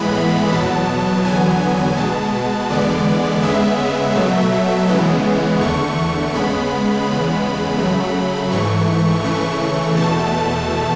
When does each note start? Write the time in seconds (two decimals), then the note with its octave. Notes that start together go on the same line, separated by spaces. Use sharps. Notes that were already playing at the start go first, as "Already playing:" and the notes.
Already playing: A2 E3 G#3 B3 B5
0.52 E2 B2 F#3 B3 A5
1.24 E2 D3 F#3 B3 G#5
1.97 B2 G#3 B3 A5
2.70 E2 D3 G#3 B3 D5
3.42 C#3 G#3 B3 E5
4.15 B2 F#3 A3
4.88 C#3 E3 G#3 B3
5.61 E2 D3 A3 C#6
5.97 C#6
6.33 C#3 G#3 B3 B5
7.06 E2 C#3 G#3 B3
7.79 C#3 F#3 A3
8.51 G#2 E3 A3 C#6
9.24 C#3 E3 A3 C#6
9.97 E2 B2 A3 A5